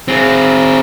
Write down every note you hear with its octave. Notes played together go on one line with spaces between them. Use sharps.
C4 G#4